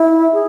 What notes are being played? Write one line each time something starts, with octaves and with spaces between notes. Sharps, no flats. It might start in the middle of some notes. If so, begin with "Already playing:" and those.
Already playing: E4
G#4